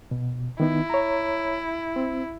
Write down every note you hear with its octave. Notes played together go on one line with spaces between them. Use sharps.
B2
D#3 B3 D#4 E4
C#5 A#5
C4